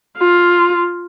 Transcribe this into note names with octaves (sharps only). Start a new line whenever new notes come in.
F4